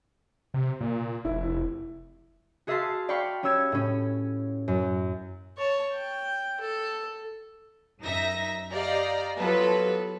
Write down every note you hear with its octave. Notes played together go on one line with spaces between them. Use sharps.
C3
A#2
F1 E4
F#4 G#4 E5 F5 A5 C6
D5 F5 G5 B5 C#6
C#4 G4 C#5 E6 G#6 E7
A2 C#4
F#2
C#5 A5
G5
A4
F#2 D#4 E5 A#6
G4 D5 D#5 F5 A#5
F#3 B3 F4 G4 A4 B4